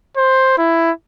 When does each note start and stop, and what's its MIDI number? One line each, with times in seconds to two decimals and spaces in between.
0.17 0.54 72
0.58 0.91 64